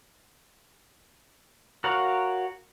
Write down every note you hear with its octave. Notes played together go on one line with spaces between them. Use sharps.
F#4 A#4 C#5 F5 F#5